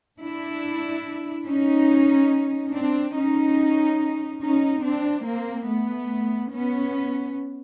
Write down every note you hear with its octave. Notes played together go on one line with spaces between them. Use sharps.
D4 E4
C#4 D#4
C4 D4
C#4 D#4
C#4 D#4
C4 D4
A#3 C4
A3 B3
B3 C#4